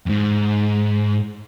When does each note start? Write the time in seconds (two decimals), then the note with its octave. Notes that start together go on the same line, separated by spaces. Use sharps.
0.06 F2 G#2